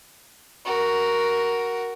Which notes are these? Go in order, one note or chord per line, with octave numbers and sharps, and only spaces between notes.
F#4 A#4